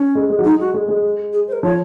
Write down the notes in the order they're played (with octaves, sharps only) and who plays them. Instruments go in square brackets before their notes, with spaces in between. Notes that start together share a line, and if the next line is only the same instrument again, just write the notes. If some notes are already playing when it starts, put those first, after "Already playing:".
Already playing: [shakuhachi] C#4
[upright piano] G#3
G#3
F#3
[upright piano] G#3 [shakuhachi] D#4
[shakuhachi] F#4
[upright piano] G#3
G#3
[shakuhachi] G#4
C5
A#4
[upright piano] F3 [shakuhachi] C#5